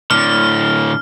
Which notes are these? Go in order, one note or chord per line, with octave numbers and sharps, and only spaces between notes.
A2 D3 F6